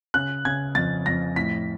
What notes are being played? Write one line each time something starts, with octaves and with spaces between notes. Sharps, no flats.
C#3 F#6
C#3 G#6
F2 A6
F2 A#6
A2 B6